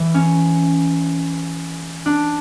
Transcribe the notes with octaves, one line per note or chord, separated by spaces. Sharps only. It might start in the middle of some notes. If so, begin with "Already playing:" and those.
Already playing: E3
C#4
D4